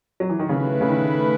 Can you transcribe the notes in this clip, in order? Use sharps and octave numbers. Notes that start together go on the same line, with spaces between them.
F#3
E3
D#3
C#3 A3 E4 B4
C#3
D#3